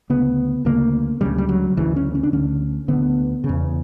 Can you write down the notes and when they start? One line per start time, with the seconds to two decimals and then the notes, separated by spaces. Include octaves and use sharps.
0.10 D2 C#3 B3
0.65 D2 C#3 A#3
1.21 D2 C#3 G3
1.38 G3
1.49 F#3
1.77 D2 C#3 E3
1.96 C#4
2.15 C#4
2.23 D4
2.33 D2 D3 C#4
2.88 D2 D3 B3
3.44 C#3
3.49 E2